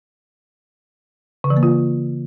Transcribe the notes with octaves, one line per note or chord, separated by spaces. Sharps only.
C#3
E3
A#3
F4